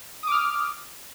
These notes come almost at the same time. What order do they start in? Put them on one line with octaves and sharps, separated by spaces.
D#6 D6 F6